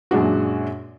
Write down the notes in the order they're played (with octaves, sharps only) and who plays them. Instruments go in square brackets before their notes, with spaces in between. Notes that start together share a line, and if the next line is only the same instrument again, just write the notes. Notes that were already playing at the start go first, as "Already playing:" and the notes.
[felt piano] F#2 A#2 G#3 D4 F#4